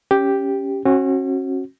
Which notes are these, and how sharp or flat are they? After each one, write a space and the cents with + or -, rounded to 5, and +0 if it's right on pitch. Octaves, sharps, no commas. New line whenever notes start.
C#4 +0 G4 +0
C#4 -40 F#4 +0